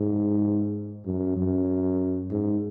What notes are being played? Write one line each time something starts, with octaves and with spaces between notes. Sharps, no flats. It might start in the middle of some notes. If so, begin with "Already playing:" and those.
Already playing: G#2
F#2
F#2
G#2